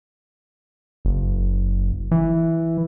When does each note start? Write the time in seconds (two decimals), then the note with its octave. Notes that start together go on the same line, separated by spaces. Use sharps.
1.05 F#1
2.11 E3